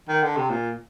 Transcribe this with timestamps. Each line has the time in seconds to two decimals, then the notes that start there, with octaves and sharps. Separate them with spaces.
0.09 D#3
0.23 D3
0.36 C3
0.50 A#2